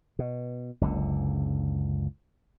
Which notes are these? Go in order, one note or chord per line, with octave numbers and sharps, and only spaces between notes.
B2
F#1 C#2 D3